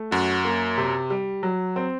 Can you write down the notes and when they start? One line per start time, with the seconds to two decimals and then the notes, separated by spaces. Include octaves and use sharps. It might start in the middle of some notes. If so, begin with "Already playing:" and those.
Already playing: A3
0.11 F#2 F#4
0.45 A#3
0.78 C3
1.10 G3
1.43 F#3
1.76 C4